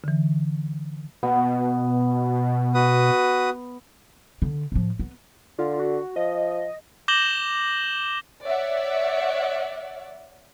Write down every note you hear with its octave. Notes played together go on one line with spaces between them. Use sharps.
D3 E3
B2 B3
F#4 B4 D#6
D3
A2 F3
B3
D3 F4
F#4
F3 D#5
D6 G6 A#6 E7 F#7 G7
C#5 D5 E5 F#5